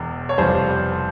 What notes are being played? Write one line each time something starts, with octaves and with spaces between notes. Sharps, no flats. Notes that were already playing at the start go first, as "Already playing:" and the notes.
Already playing: E1 E2
C#5
F1 F2 E3 G3 C5